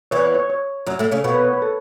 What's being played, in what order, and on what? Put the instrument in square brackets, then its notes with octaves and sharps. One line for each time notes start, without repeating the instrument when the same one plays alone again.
[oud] E2 E3 [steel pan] C#5
[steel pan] C#5
C#5
[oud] F#2 F#3
A2 A3
C#3 C#4
[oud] B2 B3 [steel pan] C#5
[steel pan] B4
C#5
B4
A4